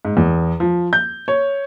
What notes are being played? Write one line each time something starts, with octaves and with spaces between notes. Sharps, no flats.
G#2
E2
F3
G6
C#5